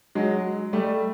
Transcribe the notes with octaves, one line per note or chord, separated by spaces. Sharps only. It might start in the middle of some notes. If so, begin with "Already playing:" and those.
F#3 G#3
G3 A3